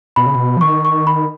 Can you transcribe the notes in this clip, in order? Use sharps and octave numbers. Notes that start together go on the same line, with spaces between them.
B2 B5
C#3
B2
F3
D#3 C#6
C#6
B5